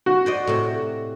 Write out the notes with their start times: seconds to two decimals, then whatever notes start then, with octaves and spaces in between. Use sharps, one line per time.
0.06 F#4
0.26 C5 D5 D#5
0.47 A2 C3